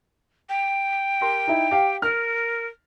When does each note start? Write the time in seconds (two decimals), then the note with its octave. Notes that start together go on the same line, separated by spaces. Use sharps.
0.49 G5
1.21 G4 A#4 C6
1.47 D#4 E4
1.71 G4 F5
2.02 A#4 F6